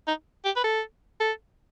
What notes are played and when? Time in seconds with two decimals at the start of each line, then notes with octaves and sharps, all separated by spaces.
0.07 D#4
0.45 G4
0.56 B4
0.64 A4
1.20 A4